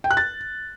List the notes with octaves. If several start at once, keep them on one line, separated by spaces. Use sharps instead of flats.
G5
F#6
A6